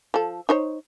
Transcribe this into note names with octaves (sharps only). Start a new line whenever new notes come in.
F3 A4
D#4 C5 C#5